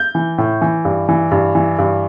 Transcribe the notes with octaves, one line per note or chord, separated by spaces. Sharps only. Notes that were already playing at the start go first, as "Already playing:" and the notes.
Already playing: G6
E3
A2
E3
G2
E3
G2
E3
G2